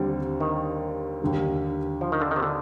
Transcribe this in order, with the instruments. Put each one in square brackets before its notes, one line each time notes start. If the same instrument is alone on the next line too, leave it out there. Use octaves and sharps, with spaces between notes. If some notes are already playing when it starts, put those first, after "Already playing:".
Already playing: [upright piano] D#2 D3 G3 C4
[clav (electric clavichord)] D#3
[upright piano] D#2 D3 G3
[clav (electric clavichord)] F3
D#3
D3
D#3
C3
D3